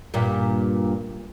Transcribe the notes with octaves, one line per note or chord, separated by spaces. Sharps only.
G2 A#2